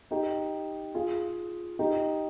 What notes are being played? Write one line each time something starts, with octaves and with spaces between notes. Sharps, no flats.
D#4 G4
F4 G#4
D#4 G4